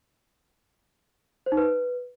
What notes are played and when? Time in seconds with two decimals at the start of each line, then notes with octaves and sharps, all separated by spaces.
1.46 C5
1.52 D#4
1.57 B4